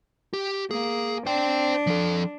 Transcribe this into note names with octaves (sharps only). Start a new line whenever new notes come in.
G4
A#3 G#4
D4 C5 G5
F3 A4